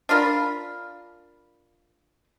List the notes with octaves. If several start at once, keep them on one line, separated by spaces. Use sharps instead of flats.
D4 F4 A#4 B5